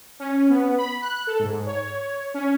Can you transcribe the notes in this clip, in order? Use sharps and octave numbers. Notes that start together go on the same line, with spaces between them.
C#4
B3
B5
F#6
A4
G#2
C#5
C#4